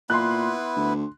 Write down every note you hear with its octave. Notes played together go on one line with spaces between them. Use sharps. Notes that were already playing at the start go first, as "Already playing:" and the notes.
A#2 B3 E4 B4 C6 F#6
D2